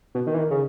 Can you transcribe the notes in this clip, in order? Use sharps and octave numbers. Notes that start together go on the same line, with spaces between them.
B2
D#3
E3
D#3
C#3